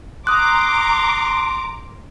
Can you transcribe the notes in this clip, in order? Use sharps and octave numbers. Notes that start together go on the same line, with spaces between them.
A#5 C6 D6 D#6 F#6